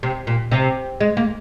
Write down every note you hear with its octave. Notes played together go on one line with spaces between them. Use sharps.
C3
A#2
C3
G#3
A#3